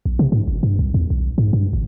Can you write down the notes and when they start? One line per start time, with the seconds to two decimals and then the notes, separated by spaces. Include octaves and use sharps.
0.05 A#1
0.19 C3
0.32 G#2
0.48 G1
0.63 G2
0.79 C2
0.94 E2
1.10 B1
1.38 G#2
1.53 G2
1.73 G#1